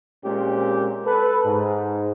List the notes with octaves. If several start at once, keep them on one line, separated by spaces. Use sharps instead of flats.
A#2 G#3 C4 C#4 G4
A4 B4
G#2